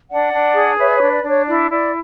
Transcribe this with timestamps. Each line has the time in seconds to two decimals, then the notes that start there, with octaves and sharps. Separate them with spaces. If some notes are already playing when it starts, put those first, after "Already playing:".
0.09 D4 D5 F#5
0.32 D4
0.55 G#4
0.77 B4 C#5 E5
0.88 D5
0.95 C#5
1.01 D4
1.12 D5
1.23 D4 D5
1.29 C#5
1.46 E4 D5
1.70 E4 D5